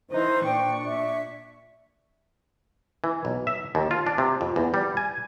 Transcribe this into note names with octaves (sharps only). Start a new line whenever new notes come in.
D#3 E3 D#4 C5
A#2 D4 G5 C#6
E5
E3
B1
E5
D#2
F4
D4
C3
F2
E2
G3
G#5